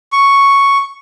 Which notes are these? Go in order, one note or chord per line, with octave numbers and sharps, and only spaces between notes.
C#6